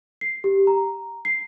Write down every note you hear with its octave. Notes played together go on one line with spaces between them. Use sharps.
C7
G4
A#5
C7